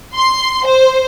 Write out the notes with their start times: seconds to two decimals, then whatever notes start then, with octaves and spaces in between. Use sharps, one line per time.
0.15 C6
0.65 C5